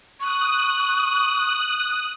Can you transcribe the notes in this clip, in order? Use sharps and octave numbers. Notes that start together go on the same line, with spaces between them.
C#6 D#6 F#6